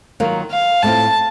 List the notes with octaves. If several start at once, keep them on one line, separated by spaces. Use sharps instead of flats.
D#3 F#3 A#3 F4
F5
A2 A3 C4 F4 A5